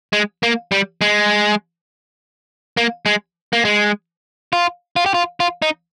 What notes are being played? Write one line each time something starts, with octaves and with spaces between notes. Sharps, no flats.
G#3
A#3
G3
G#3
A#3
G#3
A#3
G#3
F4
F4
G4
F4
F4
D#4